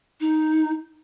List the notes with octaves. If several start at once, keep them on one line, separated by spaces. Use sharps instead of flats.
D#4